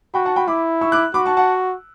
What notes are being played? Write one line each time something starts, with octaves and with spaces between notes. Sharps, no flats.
F#4 G5 B5
F#5 A5
G5 B5
E4 B5 D6
C#6 E6
D6 F#6
F#4 B5 D6
A5 C#6
F#5 A5